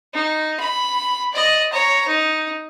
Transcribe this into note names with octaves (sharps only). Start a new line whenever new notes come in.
D#4
B5
D5 D#5
C#5 A#5
D#4